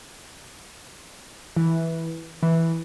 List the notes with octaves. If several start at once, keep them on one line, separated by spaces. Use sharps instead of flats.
E3
E3